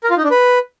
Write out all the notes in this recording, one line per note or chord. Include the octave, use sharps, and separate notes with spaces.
A#4
F4
D#4
D4
B4